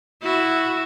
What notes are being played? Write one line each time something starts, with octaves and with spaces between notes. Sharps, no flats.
E4 F#4